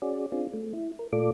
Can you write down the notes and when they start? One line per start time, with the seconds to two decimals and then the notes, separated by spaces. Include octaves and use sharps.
0.02 C#4 F#4 G#4 D5
0.32 C4 D4 F4 G#4
0.53 A3
0.73 E4
0.99 A#4
1.13 A#2 A3 F4 A4 D5 D6